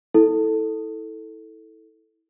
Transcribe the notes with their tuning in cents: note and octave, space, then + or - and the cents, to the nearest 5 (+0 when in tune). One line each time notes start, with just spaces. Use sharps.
E4 -25 A4 +0